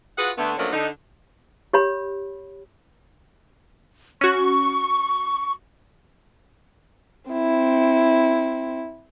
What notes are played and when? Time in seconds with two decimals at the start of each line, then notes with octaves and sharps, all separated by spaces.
0.18 F4 F#4 G#4 B4 F#5
0.38 D3 A3 B3
0.58 F3 F#3 A3 A#3 C#4 D4
0.73 D3 D#4
1.73 G4 C#5 B5
4.21 C#4 F#4 C#6
7.31 C4 E4